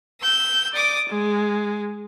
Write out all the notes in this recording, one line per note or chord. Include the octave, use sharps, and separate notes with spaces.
E6 G6
D5 D6 D#6
G#3